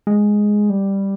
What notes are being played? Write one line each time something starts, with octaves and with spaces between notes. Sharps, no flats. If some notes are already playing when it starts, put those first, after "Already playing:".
G#3
G3